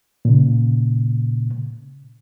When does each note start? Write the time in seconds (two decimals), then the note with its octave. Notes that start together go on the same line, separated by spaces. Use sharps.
0.25 A#2 C#3